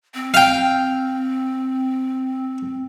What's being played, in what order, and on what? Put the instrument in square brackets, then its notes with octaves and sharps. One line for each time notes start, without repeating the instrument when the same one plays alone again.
[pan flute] C4
[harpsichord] F5 G5